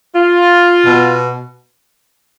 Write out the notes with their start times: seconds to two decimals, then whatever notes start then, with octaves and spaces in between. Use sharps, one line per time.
0.16 F4
0.86 B2